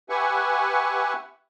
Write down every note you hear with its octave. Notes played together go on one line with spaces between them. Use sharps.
G4 B4 E5 F#5 G#5 C#6